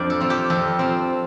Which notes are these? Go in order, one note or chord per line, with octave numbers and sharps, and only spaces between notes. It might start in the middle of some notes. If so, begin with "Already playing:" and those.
Already playing: F2 D4 F4 C5 D5
A4
F3 C4
G4
F2 A4
F3 C4